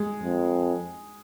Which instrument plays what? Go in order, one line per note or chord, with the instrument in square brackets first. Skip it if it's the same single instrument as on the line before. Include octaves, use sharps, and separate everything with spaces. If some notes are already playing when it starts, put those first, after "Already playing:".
Already playing: [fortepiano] G#3
[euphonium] F2